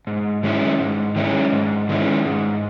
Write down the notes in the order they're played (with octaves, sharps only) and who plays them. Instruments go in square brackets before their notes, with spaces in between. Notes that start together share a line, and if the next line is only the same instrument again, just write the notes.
[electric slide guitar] G#2
D#3 G#3 C#4 E4
G#2
D#3 G#3 C#4 E4
G#2
D#3 G#3 C#4 E4
G#2